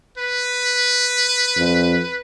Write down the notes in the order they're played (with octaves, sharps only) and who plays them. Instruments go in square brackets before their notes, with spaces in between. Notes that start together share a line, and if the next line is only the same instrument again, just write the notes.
[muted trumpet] B4
[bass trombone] F2